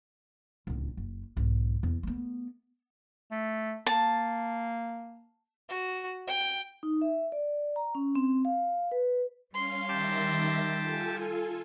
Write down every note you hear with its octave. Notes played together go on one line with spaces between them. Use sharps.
D1 C#2
F#1
B1 G#2
E2
A3 B3
A3
A#3 A5
F#4
G5
D#4
E5
D5
A#5
C#4
C4
F5
B4
G3 C#4 F5 C6
D#3 G4 E5 A5 D6 A#6
F4 A4 G#5